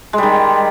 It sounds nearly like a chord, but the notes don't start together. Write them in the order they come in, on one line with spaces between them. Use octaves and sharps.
G#3 G3 D#3